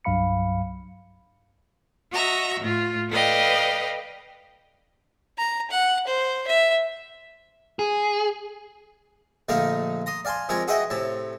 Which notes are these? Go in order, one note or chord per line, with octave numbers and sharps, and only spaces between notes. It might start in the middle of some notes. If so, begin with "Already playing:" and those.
C2 G2 F#3 F5 B5 C#7
F#4 D#5 E5 A#5
A2 F4
A4 B4 D5 D#5 F5 G5
A#5
F#5
C5
E5
G#4
A#1 D3 A3 D#4 A#4 F5
A#5 C6 D#6
D5 F5 G#5 A5 C6
C3 F3 G#3 A#4 D5 G#5
F#4 G#4 B4 D#5 E5 G5
A2 C3 A5